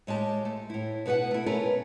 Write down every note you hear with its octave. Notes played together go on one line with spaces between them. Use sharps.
A2 G#3 G4 A5
A3
A2 E4
B2 F#4 B4 D#5 F#5
A3 E4
B2 A3 C#4 A#4 B4